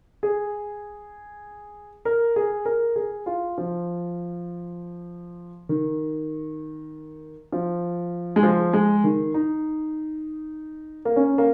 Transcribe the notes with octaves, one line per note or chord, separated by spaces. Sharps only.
G#4
A#4
G#4
A#4
G#4
F4
F3
D#3
F3
G#3
F3
G#3
D#3
D#4
A#3
C#4
A#3